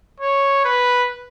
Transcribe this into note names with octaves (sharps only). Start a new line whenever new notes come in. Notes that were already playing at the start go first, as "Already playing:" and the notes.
C#5
B4